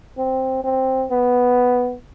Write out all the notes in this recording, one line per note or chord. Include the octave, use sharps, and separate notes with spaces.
C4
C4
B3